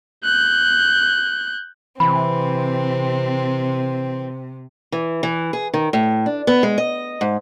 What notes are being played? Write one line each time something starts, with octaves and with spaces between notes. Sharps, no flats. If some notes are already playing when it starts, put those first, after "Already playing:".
F#6 G6
C3 E3 C4 B5
E3
E3
G#4
D#3
A2
D4
B3
G#3
D#5
G#2